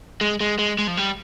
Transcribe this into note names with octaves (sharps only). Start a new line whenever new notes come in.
G#3
G#3
G#3
G#3
F3
G3